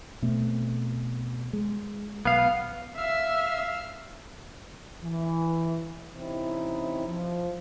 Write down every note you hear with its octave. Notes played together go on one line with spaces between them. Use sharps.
B2 A3 C4
G#3
B1 B3 F5
E5 F5 E6 F6
E3
C3 E3 C4 C#4 D#4 E4
F3